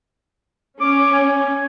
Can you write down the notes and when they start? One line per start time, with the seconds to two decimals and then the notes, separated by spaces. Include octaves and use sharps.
0.80 C#4 D6
1.12 G#5